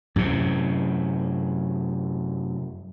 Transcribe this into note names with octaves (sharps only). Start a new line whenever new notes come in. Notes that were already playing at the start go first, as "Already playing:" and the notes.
F#2 A2 C3